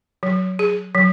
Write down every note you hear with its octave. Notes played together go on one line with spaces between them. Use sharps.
F#3
G#4
F#3